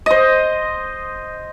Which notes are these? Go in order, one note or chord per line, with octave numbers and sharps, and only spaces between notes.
C5 D#5